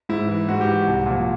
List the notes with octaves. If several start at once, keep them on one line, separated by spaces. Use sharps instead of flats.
G#2 E4
E3
G#2 F#4
G4
E3
F#4
C2
A#2 F3